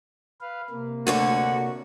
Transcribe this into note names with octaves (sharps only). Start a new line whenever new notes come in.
B4 F5
C3 A#3
D2 D3 F#4 C#5